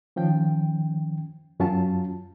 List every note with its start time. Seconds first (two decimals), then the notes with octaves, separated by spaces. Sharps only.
0.16 D#3 F3 C#4 G5
1.60 F#2 F#3 C#4 F4 A5